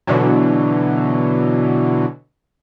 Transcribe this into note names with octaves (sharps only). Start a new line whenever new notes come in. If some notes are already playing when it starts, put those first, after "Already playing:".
B2 D3 E3 F#3